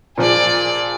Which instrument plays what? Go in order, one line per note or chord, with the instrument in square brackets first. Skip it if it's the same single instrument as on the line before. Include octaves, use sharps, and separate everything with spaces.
[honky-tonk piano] A#2 F3 [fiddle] G#4 D5